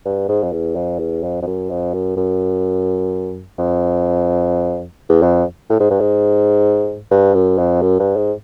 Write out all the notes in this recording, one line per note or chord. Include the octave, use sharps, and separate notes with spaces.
G2
G#2
F2
E2
F2
E2
F2
F2
F#2
F2
F#2
F#2
F2
E2
F2
A2
G#2
G2
G#2
G2
F#2
F2
F#2
G2
G#2